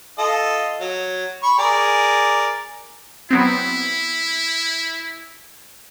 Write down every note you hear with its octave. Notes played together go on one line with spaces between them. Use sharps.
F4 A4 D#5
F#3
B5 C#6
G#4 A#4 D5
F#3 B3 C4 E4